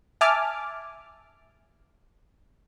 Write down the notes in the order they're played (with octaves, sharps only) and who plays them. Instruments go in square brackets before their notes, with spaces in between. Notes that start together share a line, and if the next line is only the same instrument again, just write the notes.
[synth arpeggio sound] E5 G#5 A5 D6 F6